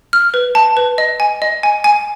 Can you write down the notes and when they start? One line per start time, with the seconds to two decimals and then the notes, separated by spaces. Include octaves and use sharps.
0.13 F6
0.34 B4
0.55 A5
0.77 B4
0.98 D#5
1.20 G#5
1.42 D#5
1.63 G#5
1.84 G#5